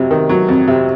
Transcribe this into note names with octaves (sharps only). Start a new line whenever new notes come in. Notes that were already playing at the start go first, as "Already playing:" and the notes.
Already playing: F2 C3 F#3
D#3
F#3
F2
C3